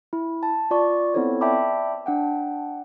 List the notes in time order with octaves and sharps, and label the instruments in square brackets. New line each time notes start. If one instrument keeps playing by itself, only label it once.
[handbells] E4
A5
F4 D5 C#6
B3 C4 E4 A4 C5 C#5
D5 E5 G5 A5 B5 D6
D4 F#5 G5